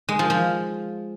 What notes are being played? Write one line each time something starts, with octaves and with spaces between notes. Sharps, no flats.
G#3
F3
F3